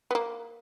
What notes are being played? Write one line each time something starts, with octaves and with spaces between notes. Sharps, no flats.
B3
A#3